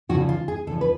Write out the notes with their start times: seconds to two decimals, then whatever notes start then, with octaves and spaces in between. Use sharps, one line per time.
0.09 D2 C#3 F3 F#4
0.29 F4
0.48 G#4
0.67 D2 C#3 F3 A4
0.81 B4